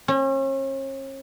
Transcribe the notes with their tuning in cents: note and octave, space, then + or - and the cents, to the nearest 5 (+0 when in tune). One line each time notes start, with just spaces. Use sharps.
C#4 -40